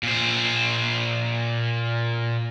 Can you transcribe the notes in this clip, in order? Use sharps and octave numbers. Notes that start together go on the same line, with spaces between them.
A#2 C5